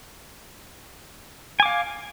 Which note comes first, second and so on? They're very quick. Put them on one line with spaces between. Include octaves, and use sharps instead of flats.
G#5 D6 F5